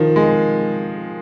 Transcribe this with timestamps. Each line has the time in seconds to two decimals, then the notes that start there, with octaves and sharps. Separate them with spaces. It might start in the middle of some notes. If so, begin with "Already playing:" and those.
Already playing: D#3 F3
0.16 G#3